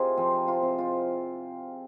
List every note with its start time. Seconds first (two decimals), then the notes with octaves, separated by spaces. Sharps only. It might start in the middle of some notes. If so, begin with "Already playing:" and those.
Already playing: C3 D#4 F4 G#4
0.17 F3 C4
0.48 F4
0.63 C3
0.78 F4